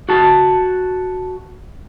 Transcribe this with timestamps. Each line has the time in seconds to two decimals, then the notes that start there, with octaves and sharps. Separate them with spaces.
0.09 F#4 A5